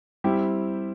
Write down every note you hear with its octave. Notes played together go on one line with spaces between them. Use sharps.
G3 C4 E4 G4